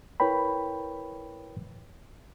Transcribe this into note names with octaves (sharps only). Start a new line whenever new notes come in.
E4 A#4 B4 C#5 G5 B5